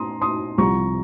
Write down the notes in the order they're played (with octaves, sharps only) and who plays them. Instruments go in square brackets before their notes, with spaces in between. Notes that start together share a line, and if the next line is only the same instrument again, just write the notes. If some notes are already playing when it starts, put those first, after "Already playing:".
Already playing: [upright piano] A#5 C6 D#6
C6 D#6
C2 C3 F3 A#5 C#6